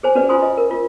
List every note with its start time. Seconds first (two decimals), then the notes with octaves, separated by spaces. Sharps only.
0.03 G#4 C5 G#5
0.15 C#4 F#4 B4 D5
0.29 F4 C5 G#5 C6 D#6
0.42 D#5
0.57 A#4
0.71 F4